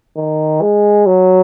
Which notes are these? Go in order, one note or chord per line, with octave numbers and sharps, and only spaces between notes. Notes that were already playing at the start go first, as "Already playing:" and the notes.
D#3
G#3
F#3